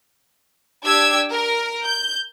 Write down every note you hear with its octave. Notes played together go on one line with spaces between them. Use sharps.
D4 G4 E6 G#6
A#4
G6